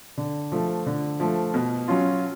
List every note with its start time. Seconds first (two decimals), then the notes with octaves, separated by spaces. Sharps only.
0.17 D3
0.52 F3 A3
0.86 D3
1.20 F3 A3
1.54 B2
1.88 F#3 C#4 F4